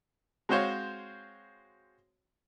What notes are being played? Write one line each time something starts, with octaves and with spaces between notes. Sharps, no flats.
G#3 C4 F#4 C5 C#5 F5